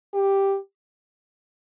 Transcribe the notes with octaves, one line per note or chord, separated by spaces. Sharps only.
G4